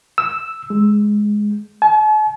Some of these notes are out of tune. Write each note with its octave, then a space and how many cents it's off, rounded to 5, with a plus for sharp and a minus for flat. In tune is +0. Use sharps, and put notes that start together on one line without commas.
E6 +0
G#3 +5
A5 -45